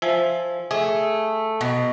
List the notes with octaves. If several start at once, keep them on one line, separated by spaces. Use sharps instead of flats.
F3 E5 G#5
A3 G#4
B2